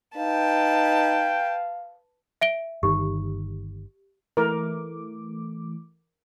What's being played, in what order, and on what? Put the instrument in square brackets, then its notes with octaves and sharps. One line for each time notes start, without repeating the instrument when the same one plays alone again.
[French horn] D#4 [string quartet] B4 A5 [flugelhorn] F5 [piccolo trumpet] G5
[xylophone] E5 D7 G7
[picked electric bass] G1 D#3 [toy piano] G4
[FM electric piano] E3 A3 D6 [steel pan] A#4